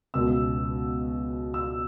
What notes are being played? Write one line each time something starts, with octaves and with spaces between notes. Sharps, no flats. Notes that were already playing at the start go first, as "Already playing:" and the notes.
C#2 B2 E6
E6